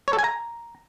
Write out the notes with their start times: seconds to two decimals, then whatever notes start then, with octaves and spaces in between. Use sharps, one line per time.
0.08 C#5
0.13 A4
0.19 G#5
0.24 A#5